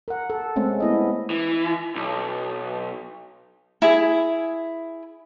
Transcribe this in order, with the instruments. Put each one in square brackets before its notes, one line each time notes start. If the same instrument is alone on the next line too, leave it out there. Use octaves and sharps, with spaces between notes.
[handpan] A#4 F#5
A4
G#3 A3 C4 C#4
B3 E4 D#5
[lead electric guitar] E3
B1
[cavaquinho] E4 G#4